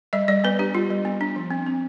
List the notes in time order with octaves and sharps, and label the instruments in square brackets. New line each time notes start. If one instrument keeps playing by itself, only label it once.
[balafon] G3 E5
G3 D5
B3 B4
D4 G4
G3 F4
G3
B3
D4
F3
C4
C4